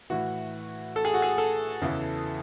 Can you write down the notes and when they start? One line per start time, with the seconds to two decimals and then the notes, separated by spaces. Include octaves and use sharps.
0.10 A2 E3 F#4
0.96 A4
1.05 G#4
1.14 F#4
1.22 G#4
1.38 A4
1.82 E2 C#3 E3